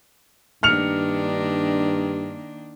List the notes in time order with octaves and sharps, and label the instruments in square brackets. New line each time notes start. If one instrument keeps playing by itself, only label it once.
[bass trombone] G2 [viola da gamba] D#3 A#3 D4 [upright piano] F6 C#7 F7